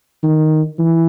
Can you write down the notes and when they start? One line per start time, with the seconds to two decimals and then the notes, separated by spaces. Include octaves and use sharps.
0.24 D#3
0.79 E3